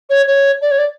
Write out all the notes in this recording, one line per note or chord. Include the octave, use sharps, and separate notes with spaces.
C#5
C#5
D5
C#5
D5